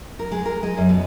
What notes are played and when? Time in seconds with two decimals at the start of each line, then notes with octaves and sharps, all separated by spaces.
0.19 A#4
0.32 G#3
0.46 A#4
0.63 G#3
0.77 F#2
0.89 B2